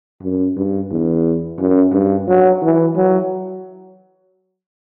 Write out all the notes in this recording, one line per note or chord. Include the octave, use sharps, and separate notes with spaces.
F#2
G2
E2
F#2
G2
F#3
E3
F#3